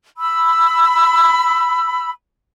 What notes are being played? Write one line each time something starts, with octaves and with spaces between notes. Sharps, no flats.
B5 E6